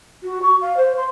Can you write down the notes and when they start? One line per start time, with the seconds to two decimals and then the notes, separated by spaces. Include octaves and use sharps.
0.23 F#4
0.42 C#6
0.61 F5
0.77 C5
0.97 C6